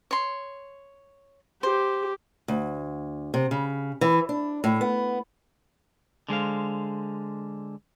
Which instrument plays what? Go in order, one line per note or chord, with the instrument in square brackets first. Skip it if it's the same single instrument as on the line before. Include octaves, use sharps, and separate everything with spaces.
[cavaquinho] C#5 C6
[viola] G4 [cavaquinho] C5
[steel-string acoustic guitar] D2
C3
C#3
E3
D4
A2
B3
[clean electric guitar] D3 G#3 C5 F5